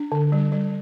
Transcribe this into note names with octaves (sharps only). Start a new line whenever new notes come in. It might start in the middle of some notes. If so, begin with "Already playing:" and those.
Already playing: D4
D3
G3
G3